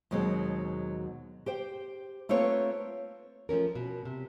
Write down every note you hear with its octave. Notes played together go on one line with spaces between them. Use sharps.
D#2 B2 F#3 G#3 C4
G4 C5 G5
A3 A#3 C4 F4 B4 C#5
F3 A3 C#4 A#4
B2
C3